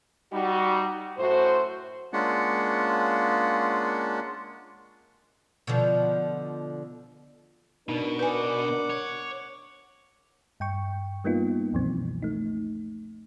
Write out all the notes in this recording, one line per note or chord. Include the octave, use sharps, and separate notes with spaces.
G3 D#4 F#4
F#2 A2 A3 F#4 C5
G#3 A#3 C#4 D4 F4 F#5
B2 D3 F3
B2 D4 D#4 A#4
B4 F#5 G#5 D6
C#5
G2 G5 C#6
G3 A#3 B3 D#4 F4
C#2 F#2 B2 E3 F3 C4
A3 D#4